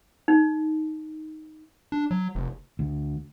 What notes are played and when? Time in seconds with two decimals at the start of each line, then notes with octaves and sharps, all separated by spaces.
0.28 D#4
1.92 D4
2.11 F#3
2.35 F1
2.79 D2